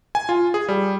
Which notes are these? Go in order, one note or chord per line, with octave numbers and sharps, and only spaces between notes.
G#5
F4
G#4
G3